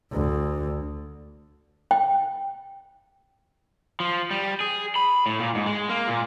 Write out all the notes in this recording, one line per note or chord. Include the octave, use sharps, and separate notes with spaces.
D2
G5
F3
G3
G#4
B5
A2
A#2
G#2
G#3
A#3
A#2